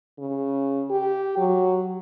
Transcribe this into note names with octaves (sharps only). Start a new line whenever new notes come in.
C#3
G4
F#3